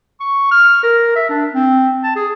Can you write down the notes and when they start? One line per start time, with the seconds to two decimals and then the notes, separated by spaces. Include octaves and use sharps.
0.20 C#6
0.51 F6
0.83 A#4
1.16 E5
1.29 D4
1.54 C4
2.04 A5
2.16 G#4